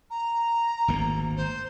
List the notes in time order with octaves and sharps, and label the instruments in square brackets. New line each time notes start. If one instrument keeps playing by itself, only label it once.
[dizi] A#5
[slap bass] G#1 D2 A#3
[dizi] C5